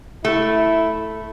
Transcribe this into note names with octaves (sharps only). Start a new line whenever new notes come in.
A3 E4